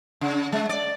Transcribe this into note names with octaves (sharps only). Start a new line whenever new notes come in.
C#3
G#3
D5